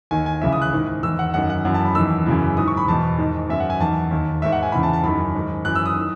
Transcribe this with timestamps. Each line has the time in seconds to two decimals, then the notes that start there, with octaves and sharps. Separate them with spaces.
0.11 D#2 D#3 G#5
0.26 G#5
0.41 C#2 C#3 E3 E5
0.52 D#6
0.62 F#6
0.73 G#2 D#3
1.03 E2 D#3 E6
1.19 F#5
1.34 F#2 D#3 F#5
1.50 F#5
1.65 F#2 E3 F#5
1.74 A5
1.85 B5
1.95 E2 D#3 E6
2.26 F#2 C#3 E3
2.57 G#2 D#3 D#6
2.68 C#6
2.77 B5
2.88 E2 B2 A5
3.19 G#2 D#3
3.49 F#2 D#3 E5
3.60 F#5
3.70 G#5
3.80 E2 D#3 A5
4.11 D#2 D#3
4.42 G#2 D#3 E5
4.52 F#5
4.63 G#5
4.72 E2 C#3 E3 B5
4.83 A5
4.93 A5
5.04 F#2 D#3 B5
5.35 G#2 D#3
5.65 F#2 E3 F#6
5.75 E6
5.86 D#6
5.96 D#3